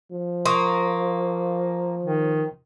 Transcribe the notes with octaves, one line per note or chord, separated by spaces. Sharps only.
F3
A#3 C6 C#6 D#6
D#3